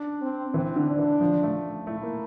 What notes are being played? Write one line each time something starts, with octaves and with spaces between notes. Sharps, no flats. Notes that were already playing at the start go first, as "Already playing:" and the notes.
Already playing: D4
C4
E3 C4
D3
D4
E3
F3
A3
A3 E4
A#3